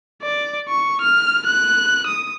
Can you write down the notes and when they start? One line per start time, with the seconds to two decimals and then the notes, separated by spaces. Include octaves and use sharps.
0.23 D5
0.68 C#6
1.01 F6
1.46 F#6
2.07 D#6